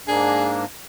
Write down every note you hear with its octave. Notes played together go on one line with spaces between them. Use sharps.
G#2 A#3 D4 G#4